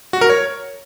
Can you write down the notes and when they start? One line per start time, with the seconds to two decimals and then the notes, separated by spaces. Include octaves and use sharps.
0.13 F#4
0.21 A#4
0.30 C#5